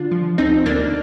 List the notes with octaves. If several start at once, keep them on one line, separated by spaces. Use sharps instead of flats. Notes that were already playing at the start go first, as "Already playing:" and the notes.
Already playing: D3 D4 F4
F3
D2 C4 D#4
D2 A#3 D4